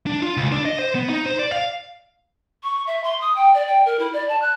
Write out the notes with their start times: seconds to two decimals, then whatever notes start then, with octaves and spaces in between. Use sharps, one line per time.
0.07 D4
0.23 F4
0.37 C#2
0.52 D4
0.65 D#5
0.79 C5
0.95 B3
1.10 D#4
1.26 C5
1.39 D5
1.52 F5
2.63 C#6
2.86 E5
3.04 C6
3.21 D#6
3.35 G5
3.54 D5
3.67 G5
3.85 A#4
3.99 E4
4.13 D5
4.29 A5
4.41 F#6